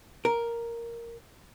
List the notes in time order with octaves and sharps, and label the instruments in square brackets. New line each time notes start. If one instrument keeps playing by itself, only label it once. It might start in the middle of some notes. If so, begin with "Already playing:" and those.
[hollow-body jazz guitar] A#4